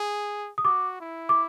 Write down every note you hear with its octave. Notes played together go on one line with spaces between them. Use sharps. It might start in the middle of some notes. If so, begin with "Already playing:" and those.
Already playing: G#4
D#6
F#4 D6
E4
D6